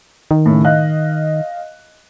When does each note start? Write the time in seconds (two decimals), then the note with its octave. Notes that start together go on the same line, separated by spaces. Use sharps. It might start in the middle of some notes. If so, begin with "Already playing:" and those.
0.31 D#3
0.46 A2 C#3
0.64 D#5 F5 F#6